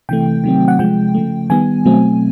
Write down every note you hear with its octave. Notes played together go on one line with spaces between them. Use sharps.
C3 E3 A3 G5
C3 D#3 F#3 A3 C4
F#5
C3 F3 G#3 G5
C#3 F3 A3
D#3 G3 B3 G#5
B2 F#3 A3 C4